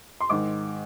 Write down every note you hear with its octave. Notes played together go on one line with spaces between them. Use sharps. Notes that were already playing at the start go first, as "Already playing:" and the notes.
C6
G#2 D#3 D6